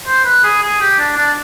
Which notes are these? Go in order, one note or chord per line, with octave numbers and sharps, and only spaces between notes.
C5
B4
G#4
G#4
G4
D4
D4